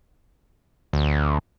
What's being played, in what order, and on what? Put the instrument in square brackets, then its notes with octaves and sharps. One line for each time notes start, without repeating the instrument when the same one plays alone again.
[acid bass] D2